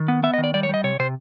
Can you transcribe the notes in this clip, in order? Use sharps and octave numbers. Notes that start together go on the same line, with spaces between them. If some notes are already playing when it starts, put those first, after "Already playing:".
Already playing: D#3
B3
B3 E5
D#5
D#3
D5
G3 D5
C#5
G3 D#5
C3 C#5
C3 C5